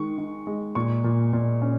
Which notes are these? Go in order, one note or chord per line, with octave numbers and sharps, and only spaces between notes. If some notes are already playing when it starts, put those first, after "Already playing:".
Already playing: D#3 G#3 C#6
D#3
G#3
A#2 C#6
A#2
A#2
C#4